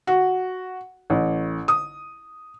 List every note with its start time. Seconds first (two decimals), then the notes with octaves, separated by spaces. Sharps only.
0.07 F#4
1.10 A1
1.68 D#6